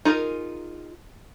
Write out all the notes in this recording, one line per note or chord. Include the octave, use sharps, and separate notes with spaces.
D#4 F4 G#4 A#4